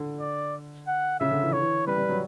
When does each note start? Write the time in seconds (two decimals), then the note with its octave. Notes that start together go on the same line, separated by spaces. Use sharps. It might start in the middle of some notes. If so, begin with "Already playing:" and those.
Already playing: D3
0.20 D5
0.87 F#5
1.20 C#3 E5
1.31 D3
1.42 E3
1.51 D3 C#5
1.60 E3
1.87 G3 B4
1.97 G3
2.09 F#3